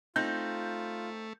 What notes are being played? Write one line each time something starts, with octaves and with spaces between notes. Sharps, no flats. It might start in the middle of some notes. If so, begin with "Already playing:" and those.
A3 C4 D#4 F4 G6